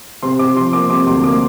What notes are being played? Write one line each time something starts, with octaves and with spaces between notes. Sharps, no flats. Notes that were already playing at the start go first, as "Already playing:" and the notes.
C3 C6
C3 D6
F3 C6
A#3 D6
C3 D6
D2 C6
A#3 D6